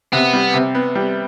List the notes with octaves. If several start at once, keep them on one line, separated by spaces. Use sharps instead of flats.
C3 B3
G3
C3
B3
G3